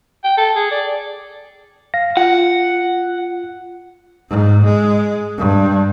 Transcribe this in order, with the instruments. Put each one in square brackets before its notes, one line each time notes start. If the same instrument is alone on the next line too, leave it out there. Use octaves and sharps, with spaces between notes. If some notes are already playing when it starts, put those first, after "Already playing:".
[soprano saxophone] G5
A4
G#4
D5
[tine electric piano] F5 A#6
[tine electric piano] F4 [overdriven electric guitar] F#5
[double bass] G#2
G#3
G2